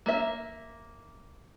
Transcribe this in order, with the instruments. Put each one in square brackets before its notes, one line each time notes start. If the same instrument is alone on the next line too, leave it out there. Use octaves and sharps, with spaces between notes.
[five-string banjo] A#3 E5